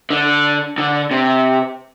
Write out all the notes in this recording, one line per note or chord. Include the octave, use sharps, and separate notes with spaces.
D3
D3
C3